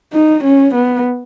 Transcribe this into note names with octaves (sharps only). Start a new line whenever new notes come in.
D#4
C#4
B3